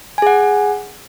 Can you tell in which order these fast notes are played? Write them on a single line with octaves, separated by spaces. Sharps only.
G#5 G#4 F#5